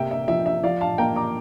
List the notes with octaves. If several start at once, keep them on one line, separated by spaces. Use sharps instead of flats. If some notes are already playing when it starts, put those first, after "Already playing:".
Already playing: C3 A#3 E5 G5
E5
F3 E5
E5
F3 D5 F5
F5 A5
A#3 G5 A#5
A#5 D6